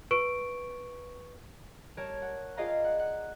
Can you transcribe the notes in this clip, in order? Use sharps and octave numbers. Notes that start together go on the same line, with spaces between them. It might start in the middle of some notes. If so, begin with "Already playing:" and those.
B4 C#6 D7
G3 A#4 C#5 A5 G#6 D7
F#5
F4 G#4 D5 D#5 F5 A#5
F#5
F#5